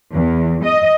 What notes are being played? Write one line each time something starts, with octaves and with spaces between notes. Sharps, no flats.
E2
D#5